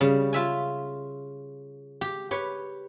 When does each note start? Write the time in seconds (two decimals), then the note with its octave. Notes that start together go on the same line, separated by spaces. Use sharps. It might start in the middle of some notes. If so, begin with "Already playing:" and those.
0.01 C#3 G3
0.33 F4 E5 G#5
2.01 G4
2.31 G4 B4 C#5